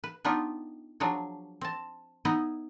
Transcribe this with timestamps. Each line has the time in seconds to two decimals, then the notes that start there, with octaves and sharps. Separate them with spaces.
0.04 B4
0.25 B3 D4 D#4 F4 G4
1.00 F3 F#3 D4 G#4 C#5
1.61 C4 A5
2.25 B3 D#4 E4 D#5